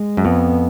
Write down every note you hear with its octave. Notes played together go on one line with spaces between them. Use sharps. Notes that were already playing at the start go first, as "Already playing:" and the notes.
Already playing: G#3
F#2
F2 B3